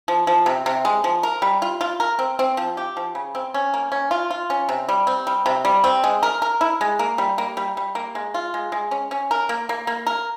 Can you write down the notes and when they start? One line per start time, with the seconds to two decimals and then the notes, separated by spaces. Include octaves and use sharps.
0.08 F3
0.27 F3
0.46 C3
0.66 C3
0.85 G#3
1.04 F3
1.23 A#4
1.42 G3
1.62 F4
1.81 F4
2.00 A#4
2.19 C4
2.39 C4
2.57 F3
2.77 G4
2.97 F3
3.15 C#3
3.35 C4
3.54 C#4
3.74 A#3
3.92 C#4
4.11 F4
4.31 F4
4.50 C#4
4.69 C3
4.89 G3
5.07 C4
5.27 G3
5.46 C3
5.65 G3
5.84 C4
6.04 G#3
6.23 A#4
6.42 A#4
6.61 E4
6.81 G#3
6.99 A#3
7.18 G3
7.38 A#3
7.57 G3
7.77 G3
7.95 A#3
8.15 G#3
8.34 F4
8.54 G#3
8.72 G#3
8.91 C#4
9.11 C#4
9.31 A#4
9.49 A#3
9.69 A#3
9.87 A#3
10.07 A#4